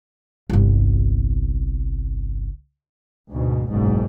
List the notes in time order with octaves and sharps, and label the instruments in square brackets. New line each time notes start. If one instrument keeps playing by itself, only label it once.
[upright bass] G1 C2
[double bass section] D2 G#2 B2
F#1 B1 G#2